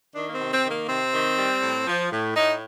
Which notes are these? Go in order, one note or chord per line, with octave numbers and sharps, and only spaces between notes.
D#3 D4
A#3
C4
C3
C4
D#3
A#3
C3 C4
D#3
G3
A2
F3
A2
A2 D#4